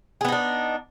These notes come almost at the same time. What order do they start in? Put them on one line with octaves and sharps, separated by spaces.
G#4 B3 D#4 D4